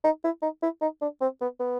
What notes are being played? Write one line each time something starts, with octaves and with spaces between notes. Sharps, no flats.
D#4
E4
D#4
E4
D#4
D4
C4
B3
B3